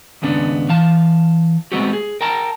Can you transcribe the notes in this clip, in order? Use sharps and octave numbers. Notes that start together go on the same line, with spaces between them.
D#2 G#2 C#3 B3 D4
E3 F5 A5
G#3 A3 B3 C4 F#4 G4
G#4
A#4 G5 A5 A#5